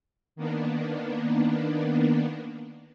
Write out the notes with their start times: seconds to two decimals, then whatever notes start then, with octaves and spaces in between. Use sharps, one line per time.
0.36 D#3 A#3 B3 D4